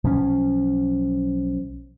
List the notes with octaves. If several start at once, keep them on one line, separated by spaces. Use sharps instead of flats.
B1 F3 C#4